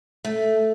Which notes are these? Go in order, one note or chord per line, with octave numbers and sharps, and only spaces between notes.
A3